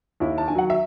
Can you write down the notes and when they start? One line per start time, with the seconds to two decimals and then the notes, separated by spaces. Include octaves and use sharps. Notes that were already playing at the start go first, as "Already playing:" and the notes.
0.20 D#2 E4
0.38 A5
0.48 D#3 G#5
0.55 F#3 F#5
0.70 E5